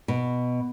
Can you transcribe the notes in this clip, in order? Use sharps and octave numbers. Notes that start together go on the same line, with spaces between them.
B2